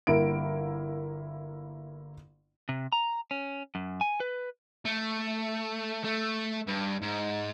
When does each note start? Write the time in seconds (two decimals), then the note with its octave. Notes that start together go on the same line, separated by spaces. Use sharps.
0.07 G1 A#3 E4 D7
2.69 C3
2.92 A#5
3.31 C#4
3.75 F#2
4.01 G#5
4.20 B4
4.85 A3
6.05 A3
6.67 G2
7.02 G#2